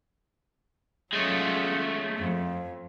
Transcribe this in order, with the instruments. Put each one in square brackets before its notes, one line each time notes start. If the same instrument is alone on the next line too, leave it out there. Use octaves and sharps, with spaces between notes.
[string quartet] F#3 C#4 F4 [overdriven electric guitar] G#3 A3
[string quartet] F2